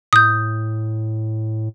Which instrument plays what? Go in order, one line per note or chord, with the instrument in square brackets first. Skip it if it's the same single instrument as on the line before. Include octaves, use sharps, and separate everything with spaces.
[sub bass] A2 [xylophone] D#6 G6